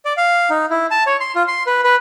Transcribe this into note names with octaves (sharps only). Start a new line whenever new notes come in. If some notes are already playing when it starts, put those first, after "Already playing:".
D5
F5
D#4
E4
A5
C#5
C6
F4
C6
B4
B4